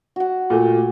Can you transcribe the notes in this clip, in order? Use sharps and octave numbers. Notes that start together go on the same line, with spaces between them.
F#4 F#5
A#2 A3